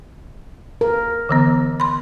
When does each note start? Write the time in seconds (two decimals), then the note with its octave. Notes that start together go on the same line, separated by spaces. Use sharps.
0.81 A#4
1.29 D3 E3 B3
1.80 B5 C6